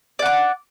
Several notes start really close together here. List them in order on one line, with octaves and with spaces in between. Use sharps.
D5 F#5 D6